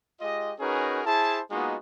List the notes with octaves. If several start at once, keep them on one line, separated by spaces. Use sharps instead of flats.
G#3 F4 G4 D#5
C#4 D#4 F#4 G#4 A#4 B4
E4 G#4 C5 A5
G#3 A#3 B3 D#4 F4 F#4